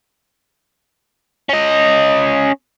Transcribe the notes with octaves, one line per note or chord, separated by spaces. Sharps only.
C#4 D#5